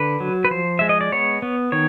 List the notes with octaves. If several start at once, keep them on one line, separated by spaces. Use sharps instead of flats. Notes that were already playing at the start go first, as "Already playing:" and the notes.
Already playing: D3 B4
F#3
B4
F3 C5
G#3 E5
D#5
D5
B3 C#5
B3
D#3 C#5